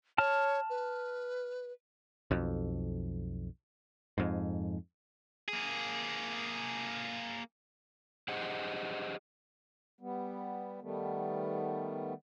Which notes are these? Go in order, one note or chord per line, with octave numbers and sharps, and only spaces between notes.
C#5 A5 F6
B4
B1 F2
F2 G#2
A#3 G#4
G4 G#4 C5 D#5 F#5
G3 B3
D#3 G3 A3 B3